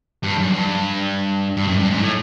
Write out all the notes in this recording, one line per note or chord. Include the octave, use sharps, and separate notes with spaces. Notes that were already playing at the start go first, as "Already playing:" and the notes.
G2
F#2
G2
G2
F#2
G2
G#2
A2